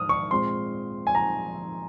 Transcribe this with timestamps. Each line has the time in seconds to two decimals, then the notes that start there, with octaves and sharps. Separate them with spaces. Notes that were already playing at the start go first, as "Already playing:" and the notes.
Already playing: G#2 D#6 F6
0.09 C#6
0.31 A#2 G#3 C4 C6
1.07 G#5
1.15 A#5